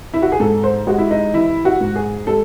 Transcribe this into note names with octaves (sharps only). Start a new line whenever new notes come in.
E4
F#4
G#4
G#2 A4
C5
G#3 F#4
E4
D#4
E3 E4
F#4
G#2
G#4
G#3 A4